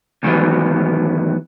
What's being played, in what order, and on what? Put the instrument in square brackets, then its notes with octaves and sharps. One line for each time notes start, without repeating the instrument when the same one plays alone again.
[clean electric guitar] D2 G#2 D#3 E3 F#3 B3